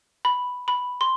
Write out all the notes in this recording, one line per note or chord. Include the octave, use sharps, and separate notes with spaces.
B5
B5
C6